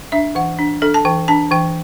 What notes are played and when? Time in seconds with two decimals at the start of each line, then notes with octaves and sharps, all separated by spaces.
0.12 D4 E5
0.35 E3 F#5
0.59 D4
0.82 D4 A4
0.94 A5
1.05 E3 G5
1.28 D4 A5
1.51 E3 G5